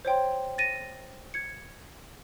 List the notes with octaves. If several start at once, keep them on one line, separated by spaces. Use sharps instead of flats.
C5 C#5 G5 C6
A6 A#6 D#7
G#6 C#7